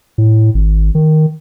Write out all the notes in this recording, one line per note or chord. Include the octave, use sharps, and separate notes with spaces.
A2
G#1
D#3